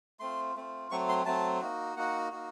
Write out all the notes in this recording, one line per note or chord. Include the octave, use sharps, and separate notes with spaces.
A3 C4 F4 C6
A3 C4 F4
F#3 A3 C4 C#6
C6
F#3 A3 C4 A5
A#3 D#4 F#4
A#3 D#4 F#4 F#5
A#3 D#4 F#4